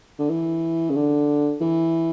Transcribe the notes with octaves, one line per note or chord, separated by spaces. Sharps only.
D3
E3
C#3
D3
E3